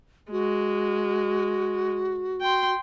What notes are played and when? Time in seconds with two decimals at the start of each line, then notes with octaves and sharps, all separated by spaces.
0.31 G#3 F#4
2.41 G5 C6